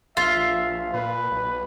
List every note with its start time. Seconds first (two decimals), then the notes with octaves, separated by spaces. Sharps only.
0.17 A#1 F4 E5
0.94 A#2 B4
1.31 B1